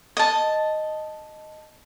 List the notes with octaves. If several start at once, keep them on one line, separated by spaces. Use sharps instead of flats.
D#5 A5